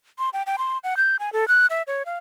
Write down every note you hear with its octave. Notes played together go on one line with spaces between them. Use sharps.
C6
G5
G5
C6
F#5
G6
G#5
A4
F#6
E5
C#5
F5